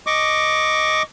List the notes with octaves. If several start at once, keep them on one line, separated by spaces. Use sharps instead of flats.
D#5 C#6 D6